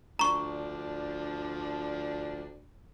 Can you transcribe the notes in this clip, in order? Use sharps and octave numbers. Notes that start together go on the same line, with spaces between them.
D2 F3 D4 A#5 C#6